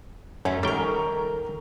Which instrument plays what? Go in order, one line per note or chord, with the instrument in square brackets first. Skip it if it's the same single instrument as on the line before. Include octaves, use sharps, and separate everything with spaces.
[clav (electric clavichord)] F#2 [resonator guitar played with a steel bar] F#3 A3 C#4
[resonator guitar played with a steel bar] D#3 A#4 [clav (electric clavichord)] G3 G5 [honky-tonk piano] A4 A#5 C#6